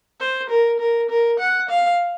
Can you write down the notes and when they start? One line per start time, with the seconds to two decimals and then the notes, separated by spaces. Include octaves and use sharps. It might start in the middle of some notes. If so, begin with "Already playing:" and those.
0.20 C5
0.50 A#4
0.80 A#4
1.09 A#4
1.39 F#5
1.69 F5